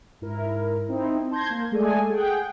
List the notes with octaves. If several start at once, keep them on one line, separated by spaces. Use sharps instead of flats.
G#2 E4 A#4
C4 D#4 E4
A5 C6 G6 G#6 A#6
A#3
G#3 A3 G#4 A4 D5 G#5
G#4 F#5 G5